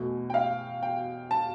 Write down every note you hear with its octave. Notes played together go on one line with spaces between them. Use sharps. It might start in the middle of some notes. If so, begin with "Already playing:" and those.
Already playing: E2 B2 A3
G5
F5
G5
A5